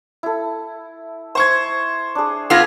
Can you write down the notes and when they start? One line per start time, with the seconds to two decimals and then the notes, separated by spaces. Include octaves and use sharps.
0.23 E4 A4
1.35 C5 C#6 G#6
2.15 D4 G#4
2.50 B3 F4 G#4 F5 G#6 A#6 C7